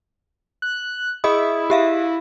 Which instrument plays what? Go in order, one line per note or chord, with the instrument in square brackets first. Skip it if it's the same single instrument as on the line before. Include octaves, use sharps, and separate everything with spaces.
[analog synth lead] F#6
[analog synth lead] E4 [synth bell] G#4 D#5 D#6
[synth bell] G4 E5 F5